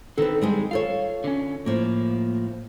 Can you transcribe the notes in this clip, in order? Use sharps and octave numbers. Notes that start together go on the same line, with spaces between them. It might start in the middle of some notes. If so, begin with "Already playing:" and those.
D3 D#3 C4 A4 B4
G3 G#3 D#4
F4 A4 C#5 F5
D3 C#4
A2 F3 A#3